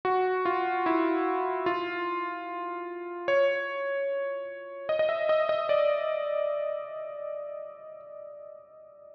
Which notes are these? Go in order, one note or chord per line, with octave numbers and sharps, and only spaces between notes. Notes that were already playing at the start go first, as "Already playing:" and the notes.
F#4
F4
E4
F4
C#5
D#5
D#5
E5
D#5
D#5
D5